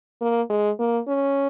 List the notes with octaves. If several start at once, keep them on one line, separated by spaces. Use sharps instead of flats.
A#3
G#3
A#3
C#4